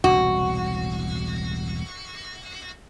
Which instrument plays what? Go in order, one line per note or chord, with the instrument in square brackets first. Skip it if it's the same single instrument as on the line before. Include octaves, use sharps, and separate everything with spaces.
[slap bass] E1 C2 A2 [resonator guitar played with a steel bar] F#4